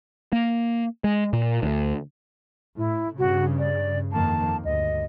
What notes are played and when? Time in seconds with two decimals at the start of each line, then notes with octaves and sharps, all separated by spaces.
0.33 A#3
1.04 G#3
1.33 A#2
1.63 D2
2.77 A2 E4
3.18 G2 C#3 F#4
3.59 D5
4.12 F2 D#3 A#3 A5
4.65 D2 G2 D#5